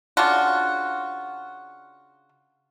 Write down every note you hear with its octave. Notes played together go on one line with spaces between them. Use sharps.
C#3 D4 F4 F#4